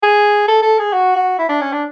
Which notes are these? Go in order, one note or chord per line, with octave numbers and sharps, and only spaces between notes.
G#4
A4
A4
G#4
F#4
F#4
E4
D4
C#4
D4